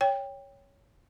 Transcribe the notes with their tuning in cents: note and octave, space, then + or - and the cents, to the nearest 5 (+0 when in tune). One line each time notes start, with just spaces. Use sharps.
C#5 +5 G5 +15